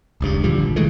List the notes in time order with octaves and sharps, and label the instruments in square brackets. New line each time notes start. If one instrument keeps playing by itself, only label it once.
[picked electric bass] D#1 C#2 G2
A#2 D3 F3 G3
G#1
D#3 E3 G#3 A3